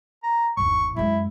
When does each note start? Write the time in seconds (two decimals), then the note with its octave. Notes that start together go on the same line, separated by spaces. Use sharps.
0.23 A#5
0.57 G1 D#2 C#6
0.96 F#2 G#3 E4